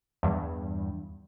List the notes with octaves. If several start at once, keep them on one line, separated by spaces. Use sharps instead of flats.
E2 G2